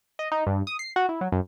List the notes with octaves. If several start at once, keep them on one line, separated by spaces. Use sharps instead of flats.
D#5
D#4
G2
D#6
C7
F#4
E4
F#3
F#2